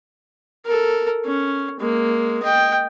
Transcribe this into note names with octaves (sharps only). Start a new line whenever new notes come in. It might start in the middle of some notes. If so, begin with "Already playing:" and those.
A4 A#4
C#4
G#3 A#3
D#5 G5